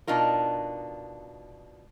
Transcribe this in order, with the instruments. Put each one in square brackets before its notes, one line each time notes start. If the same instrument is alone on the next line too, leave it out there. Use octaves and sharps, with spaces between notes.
[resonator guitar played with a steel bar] B2 D4 D#4 F4 A#4